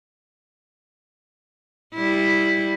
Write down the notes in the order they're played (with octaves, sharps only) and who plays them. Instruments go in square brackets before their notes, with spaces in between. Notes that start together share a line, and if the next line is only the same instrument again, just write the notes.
[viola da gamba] G3 E4